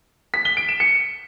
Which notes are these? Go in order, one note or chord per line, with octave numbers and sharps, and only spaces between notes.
B6
G7
D7
E7
C#7